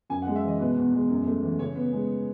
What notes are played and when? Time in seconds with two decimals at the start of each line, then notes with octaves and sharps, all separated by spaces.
0.10 F#2 G#5
0.22 F#5
0.27 G#3
0.36 E5
0.44 E3 D#5
0.59 B2 B4
0.77 E2
0.94 G#3
1.10 F#2
1.26 A3
1.43 E3
1.59 C#3 C#5
1.75 B3
1.93 G#3